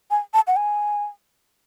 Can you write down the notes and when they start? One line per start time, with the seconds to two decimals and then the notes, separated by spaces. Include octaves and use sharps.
0.11 G#5
0.34 A5
0.47 F#5
0.56 G#5